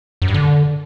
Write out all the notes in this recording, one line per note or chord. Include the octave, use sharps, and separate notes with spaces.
F#2
G2
D3